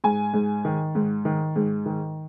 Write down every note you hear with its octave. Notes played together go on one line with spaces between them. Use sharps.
G#2 G#5
G#2
D#3
G#2
D#3
G#2
D#3